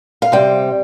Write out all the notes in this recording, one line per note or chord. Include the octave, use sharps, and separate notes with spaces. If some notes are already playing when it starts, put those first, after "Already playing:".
F5
C3 G3 C4 G5